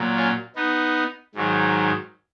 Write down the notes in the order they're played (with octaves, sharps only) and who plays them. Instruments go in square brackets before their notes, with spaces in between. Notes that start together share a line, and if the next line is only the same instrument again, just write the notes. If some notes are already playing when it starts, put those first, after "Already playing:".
Already playing: [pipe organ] A#2 F#3
C#4 F4
B3 D#4
G#2 D#3 F#3